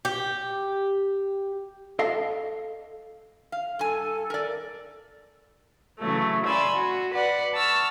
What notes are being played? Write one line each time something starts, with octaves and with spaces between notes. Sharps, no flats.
G4
A4 D#5 F5
F5
G2 A4 G#5
A#4 D5
C#3 E3 F#3 A3
D5 G#5 B5 C6 E6
F#4
B4 D5 F#5
A5 C#6 E6 F6